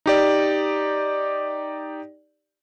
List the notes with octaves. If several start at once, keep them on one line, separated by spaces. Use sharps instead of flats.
D#4 G4 D5